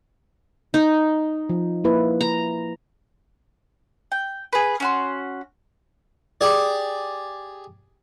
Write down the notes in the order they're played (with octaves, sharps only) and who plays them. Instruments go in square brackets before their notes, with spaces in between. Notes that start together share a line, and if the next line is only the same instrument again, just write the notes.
[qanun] D#4
[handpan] F3
A#3 E4 B4
[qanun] A#5
[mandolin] G5
G#4 B4
C#4 F#4 C6
[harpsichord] G4 G#4 D5